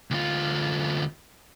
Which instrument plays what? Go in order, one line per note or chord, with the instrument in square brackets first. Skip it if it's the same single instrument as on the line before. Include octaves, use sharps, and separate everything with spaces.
[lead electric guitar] D2 F4